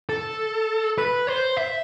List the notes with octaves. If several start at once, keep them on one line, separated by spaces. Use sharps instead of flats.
A4
B4
C5
E5